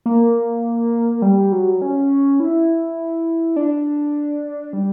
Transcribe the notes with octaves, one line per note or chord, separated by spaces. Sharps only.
A#3
G3
F#3
C#4
E4
D4
G3